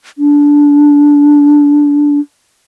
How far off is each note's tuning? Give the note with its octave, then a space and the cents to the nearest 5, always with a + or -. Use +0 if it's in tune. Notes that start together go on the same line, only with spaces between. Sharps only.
D4 -15